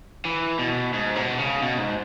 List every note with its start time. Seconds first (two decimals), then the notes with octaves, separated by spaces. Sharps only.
0.25 E3
0.59 B2
0.93 G#2
1.16 B2
1.39 C#3
1.62 B2
1.78 G#2